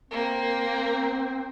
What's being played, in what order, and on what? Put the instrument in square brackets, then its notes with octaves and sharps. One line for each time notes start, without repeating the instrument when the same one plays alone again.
[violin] A#3 [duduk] C4